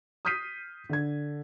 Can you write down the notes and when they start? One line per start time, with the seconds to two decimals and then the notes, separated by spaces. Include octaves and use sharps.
0.25 D#6 F6 G6 B6 C7 D#7
0.89 D3 G#6